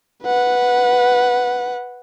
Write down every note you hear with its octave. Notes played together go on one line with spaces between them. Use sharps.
B4 F#5